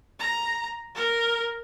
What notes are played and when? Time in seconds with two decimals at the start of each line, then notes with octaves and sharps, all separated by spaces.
0.19 A#5
0.95 A#4